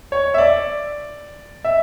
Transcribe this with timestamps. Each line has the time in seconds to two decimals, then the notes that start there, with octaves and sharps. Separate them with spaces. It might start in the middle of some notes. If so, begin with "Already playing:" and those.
0.12 C#5
0.34 E5
0.38 D5
1.65 E5